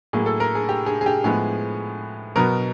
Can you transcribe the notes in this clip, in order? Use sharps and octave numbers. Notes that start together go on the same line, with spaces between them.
A2 F#3 A#3 G#4
A4
A#4
G#4
G4
G#4
G#4
G4
A2 F3 G#3 B3 G#4
B2 F#3 B3 A#4